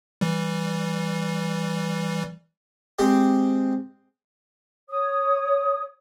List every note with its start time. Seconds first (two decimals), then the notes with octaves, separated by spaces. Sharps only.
0.21 E3 G3
2.99 G#3 C4 G4
4.89 C#5 D#6